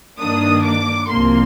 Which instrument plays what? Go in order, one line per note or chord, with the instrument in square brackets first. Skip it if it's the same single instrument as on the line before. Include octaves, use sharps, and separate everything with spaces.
[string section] G2 D#3 A#3 D4 D#6
D6
C2 C3 F3 A#3 C6